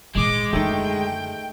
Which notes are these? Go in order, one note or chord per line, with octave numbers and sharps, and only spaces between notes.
A#2 D#3 G#3 D6
F#2 D3 D#3 A3 G5